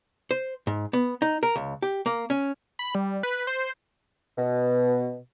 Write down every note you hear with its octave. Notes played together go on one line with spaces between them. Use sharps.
C5
G#2
B3
D#4
A#4
C#2
G4
A#3
C#4
B5
G3
B4
C5
B2